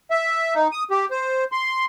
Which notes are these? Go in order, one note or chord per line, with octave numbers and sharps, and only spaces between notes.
E5
D#4
D#6
G4
C5
C6